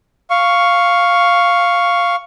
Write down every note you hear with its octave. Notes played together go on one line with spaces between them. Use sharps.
F5 C#6